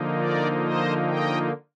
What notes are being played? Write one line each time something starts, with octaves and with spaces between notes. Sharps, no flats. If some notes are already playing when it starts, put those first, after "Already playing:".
Already playing: D3 F3 A#3 D#4
A#4 D5
C5 D#5
D#5 G5